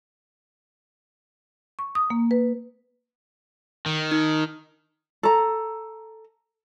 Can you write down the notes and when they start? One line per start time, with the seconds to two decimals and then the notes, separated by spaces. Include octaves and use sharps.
1.79 C#6
1.95 D#6
2.10 A#3
2.31 B4
3.86 D#3
4.11 D#4
5.23 A4 A#5